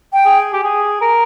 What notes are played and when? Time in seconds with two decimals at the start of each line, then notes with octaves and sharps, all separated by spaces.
0.13 G5
0.26 G#4
0.53 G4
0.64 G#4
1.01 A#4